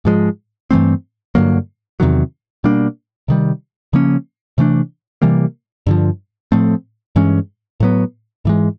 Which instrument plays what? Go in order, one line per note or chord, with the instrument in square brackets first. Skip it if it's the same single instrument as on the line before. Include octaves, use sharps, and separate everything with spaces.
[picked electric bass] G#2 F3 G#3
G2 E3 A3 C4
G2 D3 F#3 A#3
E2 C3 D#3 F#3
B2 G3 A#3 D4
C3 D#3 G3
C#3 F3 A#3 C#4
C3 E3 A3 D4
C3 E3 G3 A#3
G2 D3 F3
A2 F3 A3 C4
G2 E3 G#3 C#4
A2 F#3 B3
G#2 E3 G#3